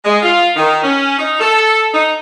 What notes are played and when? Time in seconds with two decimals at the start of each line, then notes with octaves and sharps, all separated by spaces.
0.05 G#3
0.22 F4
0.56 D#3
0.84 C#4
1.18 D#4
1.40 A4
1.94 D#4